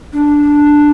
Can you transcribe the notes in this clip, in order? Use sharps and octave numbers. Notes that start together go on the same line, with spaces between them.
D4